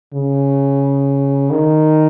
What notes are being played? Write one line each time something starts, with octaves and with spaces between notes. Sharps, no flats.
C#3
D#3